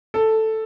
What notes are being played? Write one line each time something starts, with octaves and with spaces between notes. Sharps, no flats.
A4